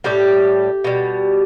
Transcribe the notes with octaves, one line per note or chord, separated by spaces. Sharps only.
A2 G3 G4
B2 G3